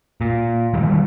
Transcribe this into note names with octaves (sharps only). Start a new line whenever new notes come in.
A#2
D#3 E3 G3